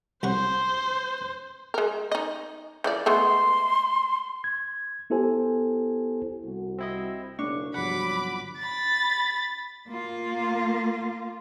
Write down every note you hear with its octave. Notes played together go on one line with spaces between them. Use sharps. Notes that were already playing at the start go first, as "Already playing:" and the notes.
C2 C5 F#5 C#6
G#3 A#4
D#4 D#5
E3 F3 D5
G#3 A3 B3 C6
G#6
B3 E4 G4 A4 C5 G#5
C2 F#4
C4 E4 D#5
F#1 B1 C#3 D4 C#6
G1 C3 F3 F#3 F#5 B5 D6
B5 A6
A#3 F4